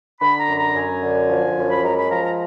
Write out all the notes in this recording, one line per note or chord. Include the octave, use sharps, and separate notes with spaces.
D3 B5
A#5
F#2
A#5
F#2 G#5
D3
F3
F#2
B5
G#3 A#5
B5
F3 A#5
A#5